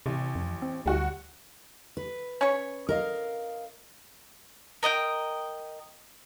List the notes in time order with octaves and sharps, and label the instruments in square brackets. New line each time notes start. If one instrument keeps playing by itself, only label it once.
[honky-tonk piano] A1 [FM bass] C3
[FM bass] F2
C4
[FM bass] D2 [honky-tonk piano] G3 F#4
[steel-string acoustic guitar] B4
[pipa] C#4 C#5
[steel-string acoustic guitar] A#4 D#5 F5
[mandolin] A#4 D#5 F#5 G5